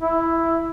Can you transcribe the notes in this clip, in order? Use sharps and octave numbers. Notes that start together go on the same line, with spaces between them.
E4